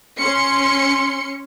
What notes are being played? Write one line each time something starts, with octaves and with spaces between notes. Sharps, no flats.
C#4 C6 C#7